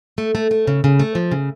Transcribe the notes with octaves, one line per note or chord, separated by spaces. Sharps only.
A3
A3
A3
C#3
C#3
A3
F3
C#3